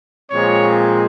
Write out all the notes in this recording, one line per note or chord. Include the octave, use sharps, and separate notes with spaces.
A#2 F3 G#3 C4 C#5